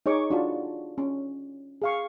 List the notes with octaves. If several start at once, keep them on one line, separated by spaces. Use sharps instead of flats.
D#4 G#4 C#5 C#6 D6
D4 F4 F#4 A5
C#4
G#4 F5 C#6